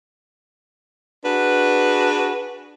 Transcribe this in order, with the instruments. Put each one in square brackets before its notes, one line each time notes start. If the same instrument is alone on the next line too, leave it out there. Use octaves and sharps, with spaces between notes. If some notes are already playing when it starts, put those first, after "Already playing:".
[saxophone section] D4 F#4 G#4 B4